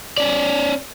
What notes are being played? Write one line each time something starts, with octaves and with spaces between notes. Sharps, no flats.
C#4 D5